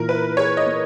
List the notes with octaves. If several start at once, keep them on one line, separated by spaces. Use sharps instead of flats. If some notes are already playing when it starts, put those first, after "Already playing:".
Already playing: A#2 E3 A#4
E4 B4
G#4 C#5
D#5
A#3